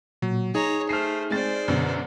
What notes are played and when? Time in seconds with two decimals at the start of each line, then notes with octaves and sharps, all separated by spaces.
0.22 A#2 F#3
0.55 D#4 G#4 C#5 A#5
0.89 A3 C5 F6 C7
1.30 G#3 C4 C5 D5 A6
1.68 F#2 B2 D3